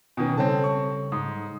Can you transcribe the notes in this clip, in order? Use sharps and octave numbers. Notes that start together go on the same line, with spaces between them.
B2 D#3 C#4 G#5
C#3 G3 C4 A4 C#5 A5
C#6
G#2 D#6